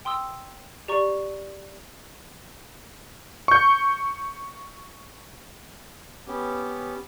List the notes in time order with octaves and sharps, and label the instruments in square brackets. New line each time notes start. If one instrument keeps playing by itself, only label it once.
[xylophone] G5 C6 D#6 E6
G4 D5 A#5 C#6
[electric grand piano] C#6 G6
[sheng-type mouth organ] B3 C#4 G4